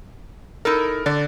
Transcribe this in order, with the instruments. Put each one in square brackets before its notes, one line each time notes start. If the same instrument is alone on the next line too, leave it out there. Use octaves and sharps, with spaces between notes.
[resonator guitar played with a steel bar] D#4 E4 A4 [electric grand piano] A#4
[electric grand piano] D3 [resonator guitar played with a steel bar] D5